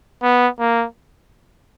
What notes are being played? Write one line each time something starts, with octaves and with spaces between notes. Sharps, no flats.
B3
A#3